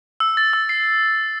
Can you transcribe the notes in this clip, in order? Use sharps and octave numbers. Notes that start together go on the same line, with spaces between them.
E6
A6
E6
C7